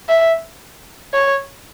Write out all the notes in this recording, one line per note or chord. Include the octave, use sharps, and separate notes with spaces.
E5
C#5